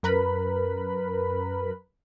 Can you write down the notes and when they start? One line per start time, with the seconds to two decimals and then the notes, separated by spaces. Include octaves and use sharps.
0.03 F#2 A#4 B4 B5